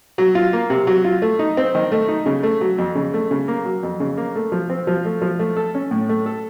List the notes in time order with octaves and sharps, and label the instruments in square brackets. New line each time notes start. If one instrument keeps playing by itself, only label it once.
[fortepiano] F#3
F4
A#3
C3
F#3
F4
A3
D#4
C4
D#3
A3
D#4
C#3
A3
F#3
F2
C#3
A3
C#3
A#3
F#3
F2
C#3
A#3
A3
F3
C4
F3
A3
F3
A3
A4
C#4
A2
A3
A4